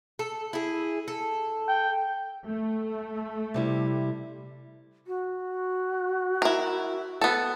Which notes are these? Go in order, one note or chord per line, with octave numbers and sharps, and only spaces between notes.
A4
E4 G#4
A4
G5
A3
C3 G3 E4
F#4
E4 A#4
B3 A4